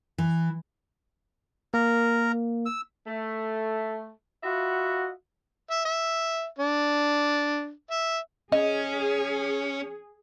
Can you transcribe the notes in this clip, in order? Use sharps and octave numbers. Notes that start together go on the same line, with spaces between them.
E3
A#3 A#4
E6
A3
F4 F#4 D#5 E5 F#5 B5
E5
E5
D4
E5
C#4 G#4 D#5